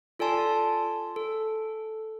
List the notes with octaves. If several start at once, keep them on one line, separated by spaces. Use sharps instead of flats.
F4 A4 D5 G#5 A5 C6
A4